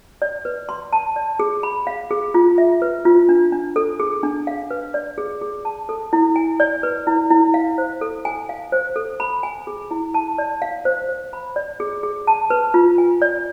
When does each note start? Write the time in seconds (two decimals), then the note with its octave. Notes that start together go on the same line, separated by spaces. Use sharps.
0.22 D5
0.45 B4
0.69 C6
0.93 A5
1.16 D5
1.40 G#4
1.63 B5
1.87 F5
2.11 G#4
2.34 F4
2.58 E5
2.82 B4
3.05 F4
3.29 D4
3.52 D4
3.76 A4
4.00 G#4
4.23 D4
4.47 F5
4.71 B4
4.94 D5
5.18 G#4
5.41 G#4
5.65 A5
5.89 A4
6.13 E4
6.36 G#5
6.60 D5
6.83 B4
7.07 E4
7.30 E4
7.54 F5
7.78 C5
8.01 A4
8.25 G#5
8.49 F5
8.72 C5
8.96 A4
9.20 B5
9.43 G#5
9.67 G#4
9.91 E4
10.14 A5
10.38 D5
10.62 F5
10.85 C5
11.09 C5
11.33 B5
11.56 D5
11.80 G#4
12.03 G#4
12.27 A5
12.50 B4
12.74 F4
12.98 G#5
13.22 D5